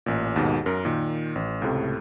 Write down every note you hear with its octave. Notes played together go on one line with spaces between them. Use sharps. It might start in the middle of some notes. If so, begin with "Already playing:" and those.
A1 A#2
D#2 G#2 B2
F#2 A#4
A#2 D#3
A1
C#2 A2 C3 A3